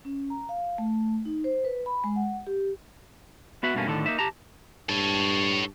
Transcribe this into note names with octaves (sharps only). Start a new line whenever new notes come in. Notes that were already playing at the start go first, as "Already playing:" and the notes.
C#4
A#5
F5
A3
D#4
C5
B4
B5
G#3
F#5
G4
B3 F#4 E5 F#5
G2 B2 A3 A#3 C#4
A2 D3 D#3 A4
A#3 D#4 E5
G4 A5 A#5
G2 A4 C#5